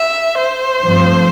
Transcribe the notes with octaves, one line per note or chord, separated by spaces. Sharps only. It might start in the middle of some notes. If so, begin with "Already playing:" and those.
Already playing: E5
C5
G2 F3 A3 C4